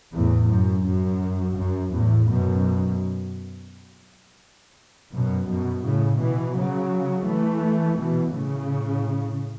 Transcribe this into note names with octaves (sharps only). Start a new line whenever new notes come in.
E2 A2
F#2
F#2
F#2
E2 A2
F#2 B2
F#2 B2
F#2 B2
A2 C#3
B2 E3
C#3 F#3
E3 A3
B2 E3
A2 C#3